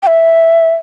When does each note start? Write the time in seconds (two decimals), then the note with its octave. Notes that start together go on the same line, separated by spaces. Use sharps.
0.03 G5
0.07 E5